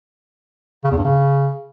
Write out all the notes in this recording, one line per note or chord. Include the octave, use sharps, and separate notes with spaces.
C#3
E2
G2
C#3